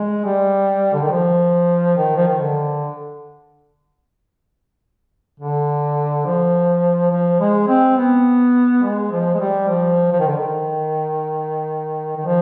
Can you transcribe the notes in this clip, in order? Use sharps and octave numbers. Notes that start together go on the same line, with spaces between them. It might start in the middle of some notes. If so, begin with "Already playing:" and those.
Already playing: G#3
G3
D3
D#3
F3
D#3
F3
D#3
D3
D3
F3
F3
G#3
C4
B3
G#3
F3
G#3
G3
F3
F3
D#3
D3
D#3
D#3
F3